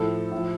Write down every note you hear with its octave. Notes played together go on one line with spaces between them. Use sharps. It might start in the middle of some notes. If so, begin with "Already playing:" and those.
Already playing: A2 F3 A4
A2 F3